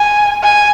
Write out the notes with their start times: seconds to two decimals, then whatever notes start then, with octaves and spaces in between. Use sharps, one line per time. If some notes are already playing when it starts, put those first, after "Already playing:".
Already playing: G#5
0.43 G#5